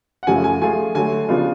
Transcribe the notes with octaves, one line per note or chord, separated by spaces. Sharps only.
F#5
F#2 C#3 F3 A3 G#5
G#5
F3 A3 F4 G#4 G#5
D3 F#3 A3 G#5
C#3 F3 B3 D4 F4